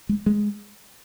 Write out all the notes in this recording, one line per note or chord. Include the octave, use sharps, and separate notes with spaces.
G#3
G#3